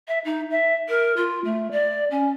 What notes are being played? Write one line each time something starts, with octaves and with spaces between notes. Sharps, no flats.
E5
D#4
E5
A#4
F4
A3
D5
C#4